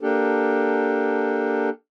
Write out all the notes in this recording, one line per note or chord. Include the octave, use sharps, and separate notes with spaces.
A#3 D4 G4 A4